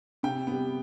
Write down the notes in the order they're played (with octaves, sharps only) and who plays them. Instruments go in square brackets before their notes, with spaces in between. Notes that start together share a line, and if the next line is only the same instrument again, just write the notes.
[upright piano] C3 G5
G3 B3